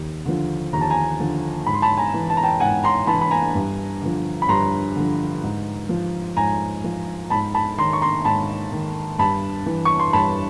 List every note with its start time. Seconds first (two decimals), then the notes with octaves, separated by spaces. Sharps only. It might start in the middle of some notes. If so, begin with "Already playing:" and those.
Already playing: D#2
0.25 D3 F3
0.73 D#2 A#5
0.81 A5
0.90 G#5 A#5
1.20 D3 F3
1.66 G#2 B5
1.74 C6
1.82 A5 B5
1.97 G#5 A#5
2.14 E3
2.30 A5
2.37 A#5
2.43 G5 A5
2.60 G#2 F#5 G#5
2.84 A#5 C6
3.07 E3 A5 B5
3.21 B5
3.31 G#5 A#5
3.55 G2
4.02 D3 F3
4.42 B5
4.49 G2 A#5 C6
4.96 D3 F3
5.43 G#2
5.89 F3
6.36 G#2 G#5 A#5
6.84 F3
7.30 G#2 A5 B5
7.54 A5 B5
7.78 D#3 A#5 C6
7.93 C#6
8.01 A#5 C6
8.25 G#2 A5 B5
8.72 D#3
9.18 G2 A5 B5
9.66 E3
9.85 C#6
9.99 C6
10.13 G2 A5 B5